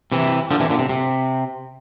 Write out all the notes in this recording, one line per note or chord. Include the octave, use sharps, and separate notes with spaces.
C3 E3
D3 F3
C3 E3
A#2 D3
C3
C3